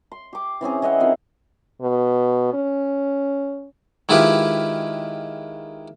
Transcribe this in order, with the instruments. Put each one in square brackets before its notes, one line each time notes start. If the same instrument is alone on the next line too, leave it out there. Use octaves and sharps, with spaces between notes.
[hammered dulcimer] C6
G4 D6
E3 C4 C#4 G#4
E3 D#5 E5 F#5
D#3 C4 F4
[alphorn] B2
C#4
[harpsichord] D#3 G#3 E4 F4 G4 B4